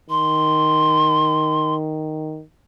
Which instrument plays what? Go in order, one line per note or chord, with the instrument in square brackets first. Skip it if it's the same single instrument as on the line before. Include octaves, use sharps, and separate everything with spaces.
[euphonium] D#3 [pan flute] C6